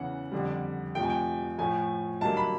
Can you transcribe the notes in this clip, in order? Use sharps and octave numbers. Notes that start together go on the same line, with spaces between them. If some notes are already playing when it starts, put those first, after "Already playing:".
Already playing: E2 C#3 E3 F#5
F2 D3 G3
F2 C3 F3 A3 G5
G#5
G5
A2 F3 A3 G#5
G2 D#3 F#3 A#3 A5
B5